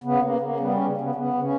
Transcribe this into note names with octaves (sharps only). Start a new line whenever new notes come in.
C#3 B3
C#3 A#3
C#3 A#3
G3 B3
C#3 C#4
C#3 B3
C#3 B3
C#3
C#4